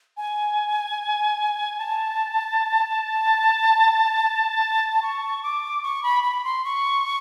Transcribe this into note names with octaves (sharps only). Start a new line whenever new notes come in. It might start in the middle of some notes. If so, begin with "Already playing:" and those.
G#5
A5
C#6
D6
C#6
B5
B5
C6
C#6